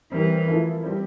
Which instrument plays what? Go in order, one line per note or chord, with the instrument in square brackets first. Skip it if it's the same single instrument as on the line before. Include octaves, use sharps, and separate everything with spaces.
[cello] E3 [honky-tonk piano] G3 C4 G4 A#4
[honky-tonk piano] F3 A3 E4 A#4
G3 C4 G4 C5